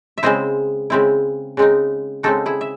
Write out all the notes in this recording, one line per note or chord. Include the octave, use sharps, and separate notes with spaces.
E5
C#3 G#3 C4 E4 C5 D#5
C#3 G#3 C4 E4
C#3 G#3 C4 D#4
C#3 G#3 C4 D#4 F#4 A4
E4 G#4
E5